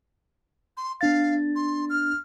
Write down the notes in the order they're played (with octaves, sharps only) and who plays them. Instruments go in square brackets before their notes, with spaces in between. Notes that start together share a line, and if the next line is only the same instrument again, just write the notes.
[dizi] C6
[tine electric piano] B3 D4 A6 [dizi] F5
[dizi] C6
F6